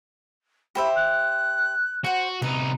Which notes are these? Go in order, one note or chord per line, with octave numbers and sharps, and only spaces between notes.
G4 C5 E5 B5
F#6
F#4 C5 F#5
C2 D#4 B4 A#5